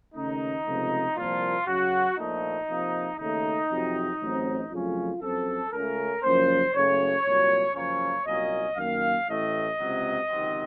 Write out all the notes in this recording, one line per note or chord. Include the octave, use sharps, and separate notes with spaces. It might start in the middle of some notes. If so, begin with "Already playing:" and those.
D#2 C#3 A3 C#4 D#4
C#2 C3 F3 A3
C2 A#2 F3 A#3 F4
F#2 C#3 F#3 F#4
A#1 A#2 F3 A3 D#4
F2 C3 F3 A#3
D#2 C#3 A3 D#4
F2 C3 F#3
A1 A2 F#3 C4
F2 C#3 F#3 A3 C#4 F4
F#2 F3 C4 A4
C#2 C#3 A3 C#4 A#4
F#1 F#2 F3 A#3 C#4 C5
F#1 F#2 C#3 A3 C#5
C2 A#2 F#3
F#2 C#3 F3 A#3 C#4 C#5
C2 A#2 F#3 A#3 C#4 D#5
F#2 D#3 A#3 F5
A1 A2 A3 D#5
C#2 C3 F#3
C#2 C3 D#3 F#3 C4